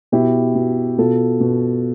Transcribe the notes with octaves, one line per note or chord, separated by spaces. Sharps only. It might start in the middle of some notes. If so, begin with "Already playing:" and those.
B2 E4 G4
B2
B2 F4 A4
B2